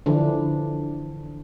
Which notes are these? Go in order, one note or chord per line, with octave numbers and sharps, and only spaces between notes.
D3 E3 F3 D4